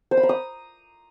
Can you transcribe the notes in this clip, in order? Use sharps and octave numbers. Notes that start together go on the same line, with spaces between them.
C5
B5
A#5
D#6